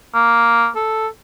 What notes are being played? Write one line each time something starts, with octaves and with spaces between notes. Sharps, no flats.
A#3
A4